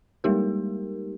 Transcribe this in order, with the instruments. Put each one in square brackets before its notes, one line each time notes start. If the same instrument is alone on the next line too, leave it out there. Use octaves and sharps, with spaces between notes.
[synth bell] G3 G#3 A#3 D#4 G4 A#4